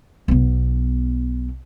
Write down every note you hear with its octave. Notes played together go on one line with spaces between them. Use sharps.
B1 B3